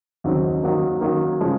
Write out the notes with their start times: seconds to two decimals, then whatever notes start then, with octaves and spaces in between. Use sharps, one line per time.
0.24 D#2 C#3 F#3 C4
0.63 D#3 F#3 A#3
1.01 D#3 F#3 A#3
1.41 C#3 F3 G#3